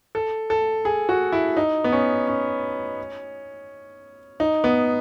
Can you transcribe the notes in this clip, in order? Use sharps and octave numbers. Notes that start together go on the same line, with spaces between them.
A4
A4
G#4
F#4
E4
D#4
B3
C#4
C#4
D#4
B3